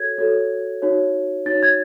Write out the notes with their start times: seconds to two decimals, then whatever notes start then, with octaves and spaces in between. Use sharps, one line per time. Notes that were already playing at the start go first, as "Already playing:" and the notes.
Already playing: F#4 A4 C#5 G#6
0.18 F#4 A4 C#5
0.82 D#4 F#4 C#5
1.46 D#4 F#4 C#5 A6
1.63 G#6